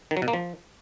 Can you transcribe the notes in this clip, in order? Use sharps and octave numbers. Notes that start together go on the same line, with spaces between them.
D#3
F#3
B2
A#3
F3